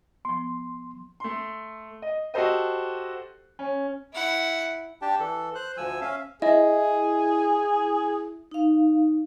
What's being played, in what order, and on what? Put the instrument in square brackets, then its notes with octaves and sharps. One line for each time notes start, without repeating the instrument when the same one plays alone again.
[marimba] F3 B3 [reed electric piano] C6
[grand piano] A3 C6
D#5
F#4 G4 A4 C5 D#5
C#4
[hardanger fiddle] E4 F#5
[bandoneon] D4 G4 G5 A5
E3 A4
C5 F#6
D2 F3 G#5 E6
C#4 E5 F5
[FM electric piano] E4 [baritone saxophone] G#4 [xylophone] D#5
[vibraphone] D#4 F5